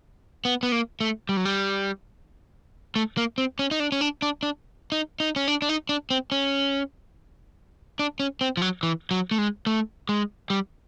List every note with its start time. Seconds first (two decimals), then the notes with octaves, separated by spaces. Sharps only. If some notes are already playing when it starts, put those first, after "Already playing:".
0.45 B3
0.63 B3
0.72 A#3
1.01 A3
1.29 G3
1.37 F#3
1.45 G3
2.96 A3
3.17 A#3
3.38 C4
3.59 C#4
3.71 D#4
3.80 D4
3.92 C#4
4.01 D4
4.22 D4
4.43 D4
4.92 D#4
5.20 D#4
5.36 C#4
5.48 D4
5.62 D4
5.69 D#4
5.89 D4
6.11 C4
6.32 C#4
7.99 D4
8.20 C#4
8.41 C4
8.57 F3
8.62 F#3
8.83 E3
9.11 F#3
9.31 A3
9.38 G#3
9.67 A3
10.09 G#3
10.50 G3